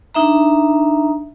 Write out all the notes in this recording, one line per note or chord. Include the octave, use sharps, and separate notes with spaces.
D4 D#4 E5 A#5